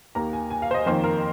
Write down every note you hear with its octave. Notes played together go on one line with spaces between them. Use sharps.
D#2 D#3 A#3 A#5
G#5
G#5
F5
C5
D#5
F2 D#3 A#3 C5
A#4